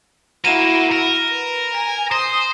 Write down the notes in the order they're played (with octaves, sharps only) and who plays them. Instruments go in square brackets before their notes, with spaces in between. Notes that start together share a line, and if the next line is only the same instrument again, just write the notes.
[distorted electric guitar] A#3 A#4 [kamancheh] E4 F#4 [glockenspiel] D#7 E7
[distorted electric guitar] A#4
[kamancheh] B4
[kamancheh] G#5 [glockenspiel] A#6
[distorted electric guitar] C5 [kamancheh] C6 D#6 [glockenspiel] A#6